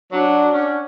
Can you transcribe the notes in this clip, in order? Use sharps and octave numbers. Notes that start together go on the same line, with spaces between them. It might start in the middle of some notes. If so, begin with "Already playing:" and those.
F#3 D4 C#5 D5 F#5
C#4